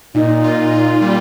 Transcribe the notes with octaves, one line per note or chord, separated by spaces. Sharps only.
A#2 D#4
F4
F4
G3